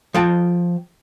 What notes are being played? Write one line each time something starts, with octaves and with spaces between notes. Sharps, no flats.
F3 G5 A5